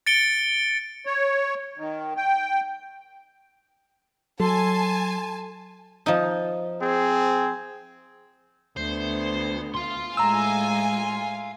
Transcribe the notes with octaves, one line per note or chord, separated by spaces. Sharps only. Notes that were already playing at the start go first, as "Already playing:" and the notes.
A6 C#7 D7 G7
C#5
D#3
G5
F#3 A4 G#5 A5 C6
F3 D#4
C4 G#4
D2 B3 C5
F5 C6
A2 G#3 G#5 A#5 E6